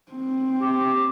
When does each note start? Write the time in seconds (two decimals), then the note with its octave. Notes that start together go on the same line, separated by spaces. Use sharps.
0.12 C4
0.62 G4